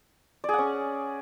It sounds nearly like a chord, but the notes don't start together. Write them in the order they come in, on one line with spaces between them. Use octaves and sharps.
D5 G#4 F#5 C#4